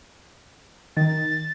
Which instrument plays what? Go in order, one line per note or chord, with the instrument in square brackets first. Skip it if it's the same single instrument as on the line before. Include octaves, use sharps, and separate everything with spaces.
[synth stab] D#3 [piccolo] A6